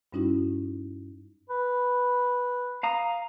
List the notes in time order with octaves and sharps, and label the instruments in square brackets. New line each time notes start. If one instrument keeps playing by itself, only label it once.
[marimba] G2 G3 C#4 D#4 E4 F#4
[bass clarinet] B4
[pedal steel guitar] F5 A#5 D#6